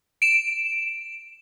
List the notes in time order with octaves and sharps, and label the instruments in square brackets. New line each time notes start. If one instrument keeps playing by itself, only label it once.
[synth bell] D7 E7